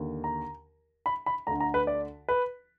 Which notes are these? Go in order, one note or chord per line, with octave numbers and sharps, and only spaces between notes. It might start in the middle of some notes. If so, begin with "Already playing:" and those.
Already playing: D#2 D3
A#5
B5
B5
D2 D3 A#5
A#5
B4
D5
B4